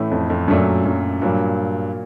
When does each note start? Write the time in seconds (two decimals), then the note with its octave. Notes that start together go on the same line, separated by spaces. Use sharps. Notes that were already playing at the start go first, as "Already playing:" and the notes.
Already playing: A2 E3 A3 C#4 E4
0.11 F2
0.30 F2
0.48 F#2 A#2 F#3 A3 D4
0.85 F#2
1.22 G2 A#2 F#3 A#3